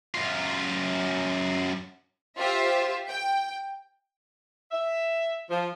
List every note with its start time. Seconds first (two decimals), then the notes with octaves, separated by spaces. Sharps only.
0.15 F#2 F4
2.38 F4 G4 C5 E5
3.09 G5
4.72 E5
5.51 F3